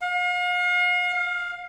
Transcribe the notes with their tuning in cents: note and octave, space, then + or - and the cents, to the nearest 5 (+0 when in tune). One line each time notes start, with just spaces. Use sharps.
F5 +45
F5 +10